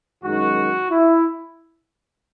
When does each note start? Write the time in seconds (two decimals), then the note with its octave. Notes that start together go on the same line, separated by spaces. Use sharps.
0.24 F#2 D#3 G#3 D#4 F#4
0.90 E4